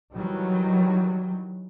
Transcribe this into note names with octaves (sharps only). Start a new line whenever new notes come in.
D#3 E3 F#3 G3